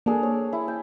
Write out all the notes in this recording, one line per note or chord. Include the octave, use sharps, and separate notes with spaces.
A#3 D4 G#4 A4
C#5
E4
G5